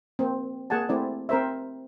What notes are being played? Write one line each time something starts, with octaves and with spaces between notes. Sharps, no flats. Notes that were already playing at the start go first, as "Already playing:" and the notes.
A#3 C4
A#3 G#4 F#5 G#5 A5
A3 C4 E4 D5
C4 A#4 C5 E5